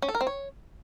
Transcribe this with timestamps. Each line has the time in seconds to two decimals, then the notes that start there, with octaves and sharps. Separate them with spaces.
0.02 C#4
0.09 A4
0.15 A#4
0.21 C4
0.27 C#5